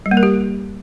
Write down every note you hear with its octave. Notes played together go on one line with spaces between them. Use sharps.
G3
A#3
A#4
G4